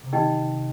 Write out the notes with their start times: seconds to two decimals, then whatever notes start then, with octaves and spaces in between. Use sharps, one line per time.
0.03 C3
0.13 D#3 D#4 G4 D#5 G5